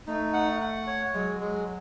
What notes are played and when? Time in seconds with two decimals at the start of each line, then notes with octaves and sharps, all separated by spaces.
0.07 A3 D#4
0.33 F#5
0.60 F#5
0.87 C#5
1.14 F#3 G#3
1.40 G#3